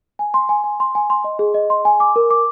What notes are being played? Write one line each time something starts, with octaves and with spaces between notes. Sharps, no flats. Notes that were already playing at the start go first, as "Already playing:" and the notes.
G#5
C6
G#5
G#5
C6
G#5
C6
D#5
G#4
D#5
C6
G#5
D6
A#4
D6